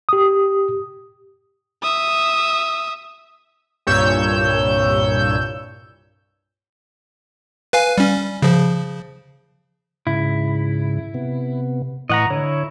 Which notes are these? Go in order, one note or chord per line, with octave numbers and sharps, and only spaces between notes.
G4 D#6
E5 D#6
C2 G2 A#2 C#5 E6 G6
B4 F5 G#5
G3 C#4
C#3 F3
G#2 C#3 E4
C3 B3
A2 E3 D#5 F#5 A#5 C#6
D3 E4 C#5